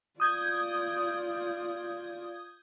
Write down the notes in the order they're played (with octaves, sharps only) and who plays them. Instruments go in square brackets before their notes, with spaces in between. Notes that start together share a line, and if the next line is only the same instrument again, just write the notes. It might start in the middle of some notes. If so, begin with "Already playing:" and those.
[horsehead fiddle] F4 D5 [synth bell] D#6 G6 G#6